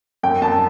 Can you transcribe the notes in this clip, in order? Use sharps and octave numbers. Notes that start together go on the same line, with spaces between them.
F#2 G5
F#2 A5